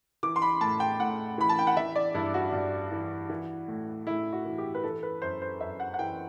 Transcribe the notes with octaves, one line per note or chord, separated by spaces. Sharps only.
E3 D6
C6
B5
A2 A5
G5
A2 F#5
E3 B5
A5
G5
F#5
E3 E5
D5
G2 E4
F#4
G2
E3
E3
A2
A2 E4
F#4
E3
G4
B4
E3 A4
B4
F#2 C5
C5
F#2 E5
F#5
F#5
E3 G5